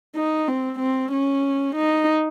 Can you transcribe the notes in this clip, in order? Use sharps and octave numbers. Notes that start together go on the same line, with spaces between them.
D#4
C4
C4
C#4
D#4